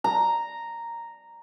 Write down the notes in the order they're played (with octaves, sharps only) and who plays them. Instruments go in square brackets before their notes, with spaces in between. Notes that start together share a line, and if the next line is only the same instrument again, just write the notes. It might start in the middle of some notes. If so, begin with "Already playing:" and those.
[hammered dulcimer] A#5